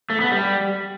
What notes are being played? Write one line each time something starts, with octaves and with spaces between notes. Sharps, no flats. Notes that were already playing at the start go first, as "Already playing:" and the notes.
A3
B3
G3